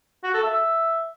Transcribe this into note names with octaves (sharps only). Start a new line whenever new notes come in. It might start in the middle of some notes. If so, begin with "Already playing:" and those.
F#4
A4
E5